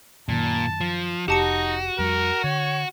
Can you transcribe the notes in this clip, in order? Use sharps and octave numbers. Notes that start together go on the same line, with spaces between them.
F#2 A#2 D#3 A5
F3
F1 D#4 F#4 G4 A5 C#7
F2 G3 A#4
D3 C#5